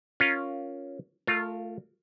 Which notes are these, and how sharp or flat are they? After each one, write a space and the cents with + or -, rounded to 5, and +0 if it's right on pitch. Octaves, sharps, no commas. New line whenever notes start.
C#4 +0 F4 +0 A#4 +0
A3 +0 F4 +0 A#4 -35